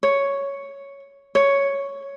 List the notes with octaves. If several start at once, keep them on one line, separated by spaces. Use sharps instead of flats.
C#5
C#5